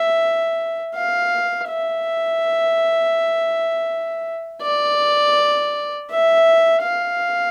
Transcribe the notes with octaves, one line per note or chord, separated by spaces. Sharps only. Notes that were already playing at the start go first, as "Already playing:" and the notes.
Already playing: E5
F5
E5
D5
E5
F5